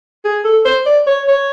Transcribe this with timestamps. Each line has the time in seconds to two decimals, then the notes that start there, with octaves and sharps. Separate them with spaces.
0.25 G#4
0.45 A4
0.65 C5
0.86 D5
1.07 C#5
1.28 C#5